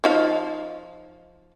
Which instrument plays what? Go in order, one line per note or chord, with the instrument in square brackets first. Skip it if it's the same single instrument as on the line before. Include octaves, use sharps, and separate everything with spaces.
[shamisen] F3 D#4 F5